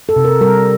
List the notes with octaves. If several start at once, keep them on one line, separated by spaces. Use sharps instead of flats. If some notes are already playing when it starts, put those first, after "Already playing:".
A4
C3
A#4
G3 A#4